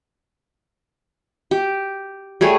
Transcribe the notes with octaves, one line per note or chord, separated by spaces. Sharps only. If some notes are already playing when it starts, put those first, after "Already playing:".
G4
G3 A3 G#4 C#5